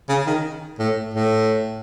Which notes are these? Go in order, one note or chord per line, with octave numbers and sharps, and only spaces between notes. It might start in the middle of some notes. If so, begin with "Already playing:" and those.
C#3
D#3
A2
A2